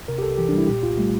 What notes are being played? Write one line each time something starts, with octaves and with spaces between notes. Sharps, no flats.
C3 A#4
G4
C2 A4
E3 G4
G3 D4
E4
A#2 G4
C2 F4
G3 A3